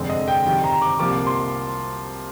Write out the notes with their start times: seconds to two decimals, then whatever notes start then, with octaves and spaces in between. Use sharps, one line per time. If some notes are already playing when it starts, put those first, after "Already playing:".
Already playing: F1 F2 D3 G#3 C4
0.10 D#5
0.28 G5
0.45 F2 C3 D#3 G5
0.64 A#5
0.82 D6
0.99 C2 C3 F3 A#3 D6
1.26 C6